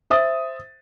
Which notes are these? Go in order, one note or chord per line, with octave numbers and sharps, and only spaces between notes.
C5 E5 D#6 A6